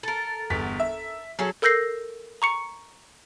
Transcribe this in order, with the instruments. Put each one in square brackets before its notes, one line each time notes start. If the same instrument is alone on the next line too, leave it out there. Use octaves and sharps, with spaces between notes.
[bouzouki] A4 A#4
[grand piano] G1 E2 B6
E5
[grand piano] F#3 [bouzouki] C#4 G#4 A4
[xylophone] A4 A#4 E6 G6 A#6 C7
A#5 C#6 C#7